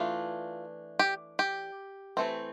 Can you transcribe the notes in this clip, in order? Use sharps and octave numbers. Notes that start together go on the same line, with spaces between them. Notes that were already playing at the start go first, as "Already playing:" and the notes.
Already playing: E3 A3 D4 F4
G4
G4
E3 A3 C4